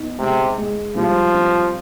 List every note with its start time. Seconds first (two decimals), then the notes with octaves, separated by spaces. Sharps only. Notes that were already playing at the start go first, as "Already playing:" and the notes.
Already playing: B3 D#4
0.19 C3 G#3
0.58 G#3
0.96 F3 G3
1.34 C4